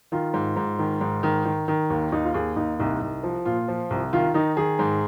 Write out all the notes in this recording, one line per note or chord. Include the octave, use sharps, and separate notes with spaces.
D#3 F4
G#2
G#2
D#3
G#2
D#3
D#3
D#3
D#2
D#2 D#4
F4
D#2 G#4
D#2 D#4
C2 D#4
C2
F3
A#2 F4
F3
C2
D#3 F4
D#3 D#4
D#3 G#4
G#2